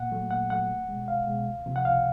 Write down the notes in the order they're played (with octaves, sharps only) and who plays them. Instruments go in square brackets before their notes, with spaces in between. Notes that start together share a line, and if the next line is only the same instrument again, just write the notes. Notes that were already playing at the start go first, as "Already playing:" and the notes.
Already playing: [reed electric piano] A#2 F#5
F#3 A3
A#2 F#5
F#3 A3 F#5
C2
B2 G#3
C2 F5
B2 G#3
C#2
C3 F3
F#5
C#2 F5